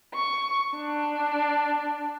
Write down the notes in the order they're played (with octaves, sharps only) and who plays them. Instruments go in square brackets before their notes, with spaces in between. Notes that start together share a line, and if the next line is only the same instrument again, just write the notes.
[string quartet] C#6
D4